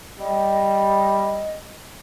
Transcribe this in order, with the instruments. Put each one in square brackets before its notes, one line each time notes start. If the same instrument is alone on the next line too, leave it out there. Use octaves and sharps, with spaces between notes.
[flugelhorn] G3 [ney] D#5